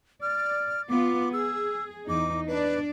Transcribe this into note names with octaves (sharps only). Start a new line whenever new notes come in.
D5 F6
B3 F4 D6
G#4 E6
E2 D#4 D6
D4 B4 D5